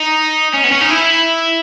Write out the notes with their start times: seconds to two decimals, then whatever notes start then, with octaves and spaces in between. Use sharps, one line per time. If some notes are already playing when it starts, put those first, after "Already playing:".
Already playing: D#4
0.54 C#4
0.64 B3
0.72 C#4
0.81 D#4
0.90 E4